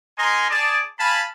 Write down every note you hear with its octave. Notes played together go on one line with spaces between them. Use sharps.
D#4 A#4 D#5 G#5 A#5 C6
G#4 D5 A5
F5 G#5 A5 B5